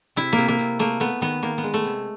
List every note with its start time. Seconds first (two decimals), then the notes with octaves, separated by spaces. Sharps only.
0.16 C3 E4
0.33 A#3
0.38 C3
0.48 A#3
0.59 C3
0.79 A3 A#3
1.00 A3 B3
1.21 D#3 B3
1.42 D#3 A#3
1.58 B3
1.63 G#3
1.74 A3
1.84 C3